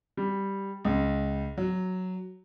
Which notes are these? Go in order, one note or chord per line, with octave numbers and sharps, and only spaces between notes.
G3
C#2
F#3